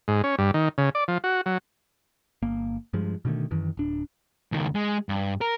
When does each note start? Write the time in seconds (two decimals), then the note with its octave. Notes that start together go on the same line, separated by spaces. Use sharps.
0.08 G#2
0.24 C#4
0.38 G2
0.54 D#3
0.78 C#3
0.95 D5
1.08 F3
1.24 F#4
1.46 F#3
2.42 G1 A#3
2.93 G2 F3 G#3
3.25 B2 D3 D#3 A3
3.51 F#2 D#3 E3
3.77 D1 D4
4.52 C#2 D#3
4.75 G#3
5.09 G2
5.41 A#4